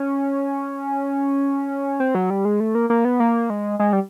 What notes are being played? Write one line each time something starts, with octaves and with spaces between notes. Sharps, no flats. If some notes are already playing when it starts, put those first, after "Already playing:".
Already playing: C#4
C4
F#3
G3
G#3
A3
A#3
A#3
B3
A#3
G#3
G#3
G3